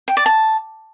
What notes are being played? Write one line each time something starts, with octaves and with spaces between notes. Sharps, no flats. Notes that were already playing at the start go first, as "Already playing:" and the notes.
G5
D5
A5